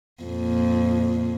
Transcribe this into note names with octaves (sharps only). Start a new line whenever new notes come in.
F2 A#2